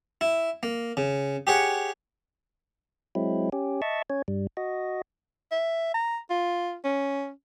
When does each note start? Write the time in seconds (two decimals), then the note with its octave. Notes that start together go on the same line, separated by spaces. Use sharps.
0.21 E4
0.63 A#3
0.97 C#3
1.47 G4 G#4 C#5 F#5
3.15 F#3 G#3 C4 E4
3.52 C#4 G4
3.82 D#5 E5 A5 C#6
4.10 C#4 C#5
4.28 G2 G3
4.57 F#4 D#5
5.51 E5
5.94 A#5
6.30 F4
6.84 C#4